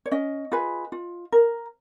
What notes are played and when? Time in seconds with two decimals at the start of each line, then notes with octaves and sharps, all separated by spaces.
0.06 C#5
0.11 C#4 D#5
0.52 F4 G#4 B4
0.92 F4
1.32 A#4